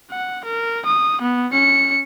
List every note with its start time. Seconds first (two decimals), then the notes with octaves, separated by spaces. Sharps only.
0.11 F#5
0.45 A#4
0.85 D#6
1.22 B3
1.53 C#4 C#7